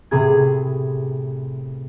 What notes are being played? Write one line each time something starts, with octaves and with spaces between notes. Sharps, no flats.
A2 C3 B3 G#4 G#6